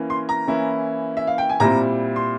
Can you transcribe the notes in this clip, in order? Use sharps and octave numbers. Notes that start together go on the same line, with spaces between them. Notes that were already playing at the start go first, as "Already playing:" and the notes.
Already playing: E3 A#3 C#4
C6
A#5
E3 A#3 C#4 E4
E5
F5
G5
G#5
A#2 G3 C4 E4 A#5
C6